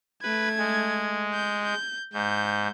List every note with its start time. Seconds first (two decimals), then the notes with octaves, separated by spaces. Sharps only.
0.23 A3 B4 G#6
0.58 G#3
1.33 G6
1.65 G6
2.13 G#2 G6